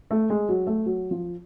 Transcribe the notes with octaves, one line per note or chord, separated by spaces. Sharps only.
A3
G#3
F#3
A3
F#3
F3